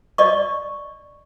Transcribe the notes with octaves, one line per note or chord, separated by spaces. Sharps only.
D5 D#5 C#6